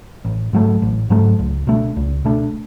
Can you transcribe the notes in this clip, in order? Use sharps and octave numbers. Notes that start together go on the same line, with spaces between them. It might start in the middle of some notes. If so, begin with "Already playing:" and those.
A1
G#2 F#3 A3
A1
G#2 F#3 A3
C#2
B2 A3 D4
C#2
B2 A3 D4